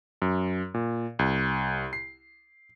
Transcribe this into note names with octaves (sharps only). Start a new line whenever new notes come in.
F#2
A#2
C2
C7